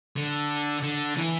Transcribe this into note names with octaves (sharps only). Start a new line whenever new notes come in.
D3
D3
E3